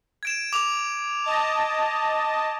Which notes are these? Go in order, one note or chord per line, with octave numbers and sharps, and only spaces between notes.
G#6 D7 E7
D6 F7
D#5 A5